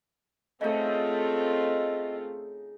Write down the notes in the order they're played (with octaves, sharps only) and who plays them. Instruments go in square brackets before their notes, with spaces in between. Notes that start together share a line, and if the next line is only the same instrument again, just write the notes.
[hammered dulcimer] C#3 D#4 [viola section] A3 C4 F4 [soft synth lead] D#5